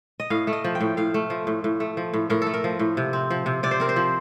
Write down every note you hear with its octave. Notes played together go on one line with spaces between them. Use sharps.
D#5
A2 F5
A3
D#5
F3
G5
A2
A2 F5
A3
F3
A2
A2
A3
F3
A2
A2 A#4
A3 A4
A#4
F3
A2
C3
C4
F3
C3
C3 D5
C5
C4 A#4
C5
F3